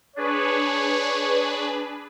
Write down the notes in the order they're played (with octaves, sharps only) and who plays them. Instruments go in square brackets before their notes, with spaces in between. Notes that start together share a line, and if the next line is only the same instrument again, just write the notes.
[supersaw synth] D4 G#4 B4 [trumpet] C#5